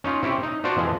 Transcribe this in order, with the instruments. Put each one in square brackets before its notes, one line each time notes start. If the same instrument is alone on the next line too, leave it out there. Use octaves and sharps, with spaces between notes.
[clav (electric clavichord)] C#4 D#4 F4
C4 C#4 E4 G4
D#4
D4 F4 F#4 C5 D5
F2 E3 F3 G#3